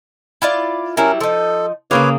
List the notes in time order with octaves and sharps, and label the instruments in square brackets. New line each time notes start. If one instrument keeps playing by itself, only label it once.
[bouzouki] E4 F4 D5
[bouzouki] F#3 G3 E4 [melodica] C#4 A#4
[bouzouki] F3 D#4 [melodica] A4
[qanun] C#3 A#3 G#4 [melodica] B4 C#5 D6 [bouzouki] F5